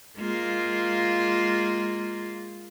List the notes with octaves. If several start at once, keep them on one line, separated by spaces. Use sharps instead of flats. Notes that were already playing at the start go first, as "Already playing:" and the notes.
G#3 A#3 F4